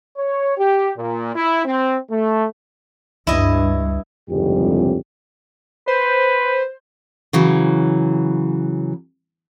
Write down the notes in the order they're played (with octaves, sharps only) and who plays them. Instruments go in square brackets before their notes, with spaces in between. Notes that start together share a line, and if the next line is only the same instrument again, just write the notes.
[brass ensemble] C#5
G4
A#2
E4
C4
A3
[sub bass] C#2 [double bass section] G2 [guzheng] E4 D#5
[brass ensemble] G1 C2 F2 [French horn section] G#2 C#3 G4
[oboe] B4 [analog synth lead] C5
[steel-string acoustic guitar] C#3 E3 F#3